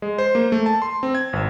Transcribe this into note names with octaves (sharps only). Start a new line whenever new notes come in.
G#3
C5
A#3
A3
A5
C6
C4
G#6
G#1